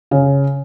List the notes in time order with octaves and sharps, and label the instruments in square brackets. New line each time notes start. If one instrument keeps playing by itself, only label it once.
[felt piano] C#3